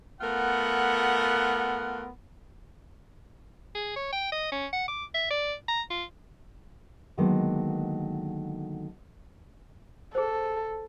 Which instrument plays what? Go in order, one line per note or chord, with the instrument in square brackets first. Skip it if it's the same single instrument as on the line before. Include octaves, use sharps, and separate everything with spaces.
[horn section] A3 B3 F4 A#4 F#5
[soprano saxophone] G#4
C#5
G5
D#5
C#4
F#5
D6
E5
D5
A#5
F4
[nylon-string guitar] D3 D#3 F#3 G#3 A#3 B3
[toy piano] G#4 C5 [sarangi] A4